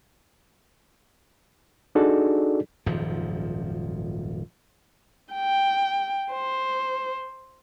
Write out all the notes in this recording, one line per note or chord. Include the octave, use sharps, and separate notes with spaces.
D4 D#4 F#4 G#4 A4 D5
D#1 G#1 F#2 F3
G5
C5